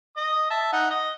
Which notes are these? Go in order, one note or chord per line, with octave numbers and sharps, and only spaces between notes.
D#5 D#6
E5 A5
D#4 F#5
D#5